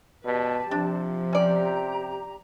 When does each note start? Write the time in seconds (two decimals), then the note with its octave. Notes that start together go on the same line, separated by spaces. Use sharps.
0.25 B2 G4 B4 D5 A5
0.71 C3 F3 D4
1.33 C#4 G4 D5 A#5